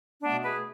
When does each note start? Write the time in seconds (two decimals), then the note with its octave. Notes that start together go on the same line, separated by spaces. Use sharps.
0.22 B2 A3 B3 D4
0.44 G#4 B4